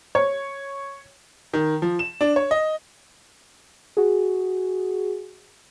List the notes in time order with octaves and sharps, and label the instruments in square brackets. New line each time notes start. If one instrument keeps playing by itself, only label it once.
[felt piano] C#5
[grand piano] D#3
F3
E7
D4
C#5
D#5
[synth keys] F#4 G#4